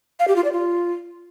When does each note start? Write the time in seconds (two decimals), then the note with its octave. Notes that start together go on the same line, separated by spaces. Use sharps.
0.20 F5
0.28 G4
0.36 F4
0.44 D5
0.53 F4